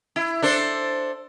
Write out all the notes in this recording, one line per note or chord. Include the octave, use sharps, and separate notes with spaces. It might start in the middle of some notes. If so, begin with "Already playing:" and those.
E4
D4 A4 C5